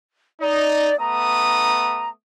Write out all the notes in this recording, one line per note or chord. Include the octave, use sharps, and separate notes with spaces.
D#4 D5
A3 B3 A#5 D#6